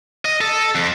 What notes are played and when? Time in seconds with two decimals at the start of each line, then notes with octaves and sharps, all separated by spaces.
0.25 D#5
0.41 A4
0.75 F2